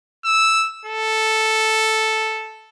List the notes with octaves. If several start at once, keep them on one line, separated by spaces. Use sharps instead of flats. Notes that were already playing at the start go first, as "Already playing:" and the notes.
E6
A4